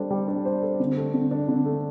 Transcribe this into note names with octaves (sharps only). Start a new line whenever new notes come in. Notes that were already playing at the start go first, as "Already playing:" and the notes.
Already playing: G3 D4 A4 C5
G3
D4
C5
A4
D3
A3
D3
D4
D3
A3